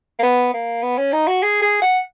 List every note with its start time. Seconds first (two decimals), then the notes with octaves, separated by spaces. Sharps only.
0.19 A#3
0.23 B3
0.54 A#3
0.83 B3
0.98 C#4
1.13 D#4
1.28 F#4
1.43 G#4
1.62 G#4
1.82 F#5